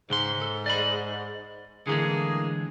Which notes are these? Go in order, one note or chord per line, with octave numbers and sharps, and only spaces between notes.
C#2 G#2 C6
A4
D5 D#5 B5
A2 D3 E3 G#3 A#3 G#4